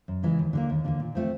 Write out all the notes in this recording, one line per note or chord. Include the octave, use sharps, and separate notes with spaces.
F#2
C#3 E3 G#3
D#2
D3 G3 A#3
D#2
D3 G3 A#3
A#2
F3 A3 C4